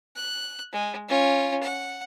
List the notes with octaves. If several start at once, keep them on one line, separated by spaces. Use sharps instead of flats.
F#6
G#3
C#4 F4
F#5